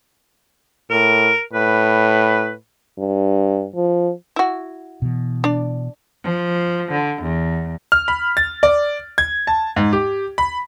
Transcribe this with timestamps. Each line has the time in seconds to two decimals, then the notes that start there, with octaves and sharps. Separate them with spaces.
0.90 A2 A#4
1.53 A2 B4
2.98 G2
3.75 F3
4.36 E4 F#4
5.02 B2 E3
5.44 D4 D5
6.24 F3
6.92 D3
7.22 E2
7.92 F6
8.08 B5
8.37 A6
8.63 D5
9.18 G#6
9.47 A5
9.76 G#2
9.93 G4
10.38 B5